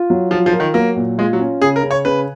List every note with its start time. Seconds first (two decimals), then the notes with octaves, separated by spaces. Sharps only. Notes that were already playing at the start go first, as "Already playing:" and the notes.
Already playing: F4
0.10 F#3
0.31 F3 F4
0.46 F3
0.53 A#4
0.60 D#3
0.74 F#3 A#3
0.96 A#2
1.18 G#3 F4
1.33 F#3
1.40 C#4
1.61 C#3 G#4
1.76 A#4
1.83 C#3
1.91 C#5
2.05 C#3 B4